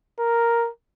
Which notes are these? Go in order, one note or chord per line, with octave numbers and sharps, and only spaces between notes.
A#4